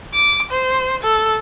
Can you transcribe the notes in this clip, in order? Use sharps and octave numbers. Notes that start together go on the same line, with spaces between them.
D6
C5
A4